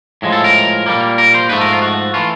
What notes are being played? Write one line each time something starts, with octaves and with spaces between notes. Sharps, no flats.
A2 F3 G#3
A4
A#4
A#2 G3 A#3
A#4
C5
G#2 F3 A3 B4
A#4
F4
F#4
E3 A3 F4